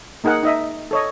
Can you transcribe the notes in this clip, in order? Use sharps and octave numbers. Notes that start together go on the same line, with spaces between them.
A#3 D#4 G#4 A#4 F#5
D#4 D#5 E5
A4 C#5 D#5